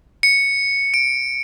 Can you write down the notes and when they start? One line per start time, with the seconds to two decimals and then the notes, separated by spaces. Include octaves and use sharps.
0.23 C#7
0.94 D7